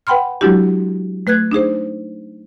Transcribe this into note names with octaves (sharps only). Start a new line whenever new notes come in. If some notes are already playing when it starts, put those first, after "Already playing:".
B4 F#5 G5 B5 C6 F6
F#3 G#3 D4 E4 F#4 G4
A3 B4 F#6 G#6
D4 D#4 G#4 C5